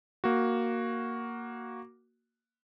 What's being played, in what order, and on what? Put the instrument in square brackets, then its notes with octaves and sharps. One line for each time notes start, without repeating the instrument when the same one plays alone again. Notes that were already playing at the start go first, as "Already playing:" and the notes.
[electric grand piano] A#3 F#4